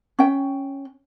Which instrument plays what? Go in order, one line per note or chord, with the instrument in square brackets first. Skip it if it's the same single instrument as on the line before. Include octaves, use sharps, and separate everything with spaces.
[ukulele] C#4 G5